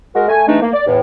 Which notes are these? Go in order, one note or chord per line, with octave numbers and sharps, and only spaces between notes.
G#3 F#4 A#4
A3 G#5
E3 G#3 A3 D4 D#4
A#3
D5
E2 A2